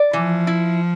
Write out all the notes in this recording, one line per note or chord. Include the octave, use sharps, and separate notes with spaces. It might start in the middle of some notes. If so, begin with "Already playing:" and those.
Already playing: D5
E3 F3
E4